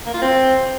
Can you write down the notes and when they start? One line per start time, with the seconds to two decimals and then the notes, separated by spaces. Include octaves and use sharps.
0.06 A#3
0.14 F4
0.21 C4